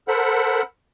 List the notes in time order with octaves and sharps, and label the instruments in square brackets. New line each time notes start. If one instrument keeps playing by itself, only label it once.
[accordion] A4 A#4 C5 F#5 B5